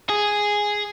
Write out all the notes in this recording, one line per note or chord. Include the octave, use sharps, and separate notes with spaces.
G#4